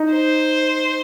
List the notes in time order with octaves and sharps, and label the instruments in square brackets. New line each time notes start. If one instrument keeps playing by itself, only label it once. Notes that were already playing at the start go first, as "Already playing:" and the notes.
Already playing: [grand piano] D#4
[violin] C5